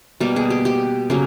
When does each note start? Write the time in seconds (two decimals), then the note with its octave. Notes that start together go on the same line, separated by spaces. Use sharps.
0.20 B2 G3 A#3 G4
0.36 G#4
0.50 G4
0.65 G4
1.10 C#3 F#3 A#3